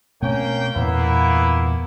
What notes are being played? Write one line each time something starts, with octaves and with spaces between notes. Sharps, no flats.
B2 A3 A#3 C4 C#4 G5
E2 G2 A#2 A#3 B3 E4